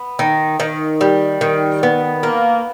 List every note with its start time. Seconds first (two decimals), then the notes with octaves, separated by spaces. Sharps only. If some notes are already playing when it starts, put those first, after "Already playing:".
Already playing: B3
0.19 D#3
0.60 D#3
1.01 G3
1.41 D#3
1.83 B3
2.23 A#3